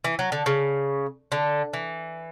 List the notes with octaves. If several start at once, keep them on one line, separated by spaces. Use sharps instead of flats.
E3
F#3
D3
C#3
D3
E3